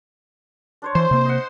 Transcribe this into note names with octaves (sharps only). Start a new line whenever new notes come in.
D4 C5 C#5
E3 C5 C6
C3 A#3
D#5 F#5